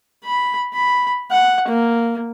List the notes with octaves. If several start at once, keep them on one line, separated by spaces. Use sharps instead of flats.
B5
B5
F#5
A#3